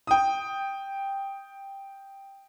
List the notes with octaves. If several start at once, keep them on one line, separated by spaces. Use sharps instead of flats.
G5 D#6